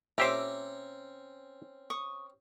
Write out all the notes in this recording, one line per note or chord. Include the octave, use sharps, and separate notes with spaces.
A#2 C4 C#4 G4 C5 E5 A#5 D6
C#6 D#6